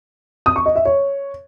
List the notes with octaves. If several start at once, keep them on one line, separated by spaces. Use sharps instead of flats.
D#6
C#6
D#5
E5
C#5